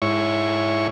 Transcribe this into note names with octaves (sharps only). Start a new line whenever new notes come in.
G#2 E4 C#5 C#6